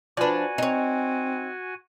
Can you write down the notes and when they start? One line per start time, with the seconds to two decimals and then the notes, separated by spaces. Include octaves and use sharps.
0.17 F3 D4 F#4 B4 D5 G#5
0.58 C4 D#4 C#5